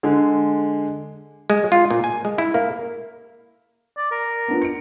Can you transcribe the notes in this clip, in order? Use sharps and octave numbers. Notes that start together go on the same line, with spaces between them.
D3 G#3
G#3
F4
A#2
G#5
G#3
E4
A#3
D5
A#4
B3 D4 F4
C#7 D7